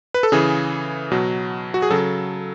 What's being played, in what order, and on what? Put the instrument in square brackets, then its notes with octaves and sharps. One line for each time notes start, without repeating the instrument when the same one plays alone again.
[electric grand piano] B4
A4
C#3 E3 G#4
B2 F#3
F#4
G#4
C#3 F#3 A4